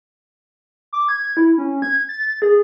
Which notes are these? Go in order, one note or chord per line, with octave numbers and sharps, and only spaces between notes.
D6
G#6
E4
C#4
G#6
A6
G#4